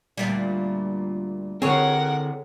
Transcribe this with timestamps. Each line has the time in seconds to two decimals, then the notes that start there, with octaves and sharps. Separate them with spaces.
0.17 D2 A#2 G3
1.62 D3 C4 G#4 A#4 C#5 F#5